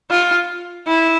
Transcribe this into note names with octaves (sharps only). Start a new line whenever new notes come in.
F4
E4